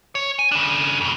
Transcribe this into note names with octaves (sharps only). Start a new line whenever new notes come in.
C#5
G#5
C#3 D4
F2 B2